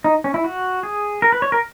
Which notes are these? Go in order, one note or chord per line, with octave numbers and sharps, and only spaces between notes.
D#4
C#4
E4
F#4
G#4
A#4
B4
C#5
A#4